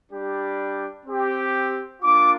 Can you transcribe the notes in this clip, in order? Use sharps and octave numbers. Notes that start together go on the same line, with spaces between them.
G3 D4 G4
C4 G4
A#3 D4 F4 D6